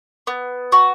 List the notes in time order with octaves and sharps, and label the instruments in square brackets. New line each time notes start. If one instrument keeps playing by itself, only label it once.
[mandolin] B3
F#4